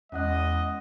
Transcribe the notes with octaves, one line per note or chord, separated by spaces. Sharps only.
E2 G#3 C#4 D#5 F#5 F#6